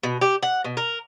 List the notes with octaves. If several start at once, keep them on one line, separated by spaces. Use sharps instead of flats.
B2
G4
F#5
B2
A#4